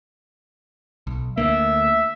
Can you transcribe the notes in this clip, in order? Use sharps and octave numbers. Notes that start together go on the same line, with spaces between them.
B1
D2 A#3 E5